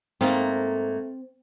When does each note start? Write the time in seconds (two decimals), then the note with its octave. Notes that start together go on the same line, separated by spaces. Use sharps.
0.21 G#2 A3 A#3 C4